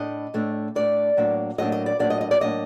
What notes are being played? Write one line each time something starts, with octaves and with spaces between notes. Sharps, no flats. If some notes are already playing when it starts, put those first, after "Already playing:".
Already playing: A2 A3 D4 D#5
A2 A3 D4
A2 A3 D4 D5
A2 F#3 A#3 D4
A2 F#3 A#3 D4 D#5
D#5
D5
A2 F#3 A#3 D4 D5
D#5
D#5
D5
A2 F#3 A#3 D4 D#5